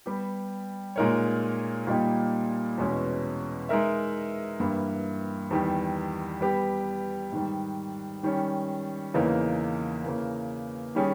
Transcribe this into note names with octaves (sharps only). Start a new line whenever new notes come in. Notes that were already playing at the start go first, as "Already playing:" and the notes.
G3 B3 G4
A#2 G#3 D#4 A#4 C#5
A#2 G3 A#3 D#4 G4
E2 B2 G#3 C#4
G#3 D#4 A#4 E5
G2 E3 A#3 E4
E2 D#3 G3
G3 B3 G4
G#2 D#3 G3
D#3 G3 C#4
E2 C#3 E3 A#3 D#4
C#3 E3 A#3
D#3 G3 C#4 G#4